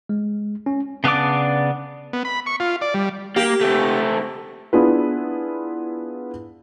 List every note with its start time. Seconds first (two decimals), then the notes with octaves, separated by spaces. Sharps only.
0.09 G#3
0.66 C#4
1.04 C#3 B3 D4 D5 D6
2.13 B3
2.25 B5
2.46 C#6
2.60 F4
2.81 D5
2.94 G3
3.36 A#3 G4
3.61 A3 C4
4.73 B3 D4 E4 F4 G#4 B4